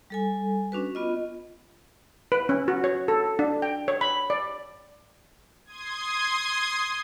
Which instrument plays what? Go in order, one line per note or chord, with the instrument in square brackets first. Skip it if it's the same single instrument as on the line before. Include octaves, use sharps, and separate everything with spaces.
[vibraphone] G3 A4 G#5
C#4 D4 F#4 B4
B3 F4 D#5
[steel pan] B4
C#4
F#4
C#5
A4
D4
G5
C#5
B5
D5
[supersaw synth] C6 D#6 G#6